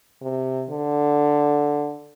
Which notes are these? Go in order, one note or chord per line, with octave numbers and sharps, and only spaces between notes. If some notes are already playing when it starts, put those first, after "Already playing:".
C3
D3